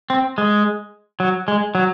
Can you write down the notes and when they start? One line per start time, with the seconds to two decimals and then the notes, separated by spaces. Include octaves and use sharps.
0.10 C4
0.38 G#3
1.20 F#3
1.48 G#3
1.75 F#3